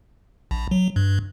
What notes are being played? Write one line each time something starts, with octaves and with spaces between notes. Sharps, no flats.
A#1
F#3
G2